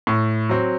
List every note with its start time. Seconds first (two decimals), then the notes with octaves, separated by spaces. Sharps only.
0.07 A2
0.49 F#3 C4